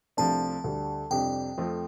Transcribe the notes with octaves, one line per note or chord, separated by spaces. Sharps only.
C2 C3 F3 A3 D4 A5
D2 D3 G3
F2 C3 G3 D4 G4 G5
F2 F3 A3 C4 F4